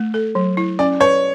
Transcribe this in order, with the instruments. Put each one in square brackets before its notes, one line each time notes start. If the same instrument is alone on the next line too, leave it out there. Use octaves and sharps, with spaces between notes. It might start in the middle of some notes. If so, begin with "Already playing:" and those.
Already playing: [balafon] A3
A4
F#3
E4
[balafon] C#4 [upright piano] D5
[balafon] B4 [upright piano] C#5